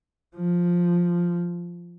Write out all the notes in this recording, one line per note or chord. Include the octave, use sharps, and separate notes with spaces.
F3